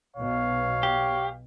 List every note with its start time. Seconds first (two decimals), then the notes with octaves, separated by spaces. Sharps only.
0.16 B1 B2 C#5 F5
0.83 G4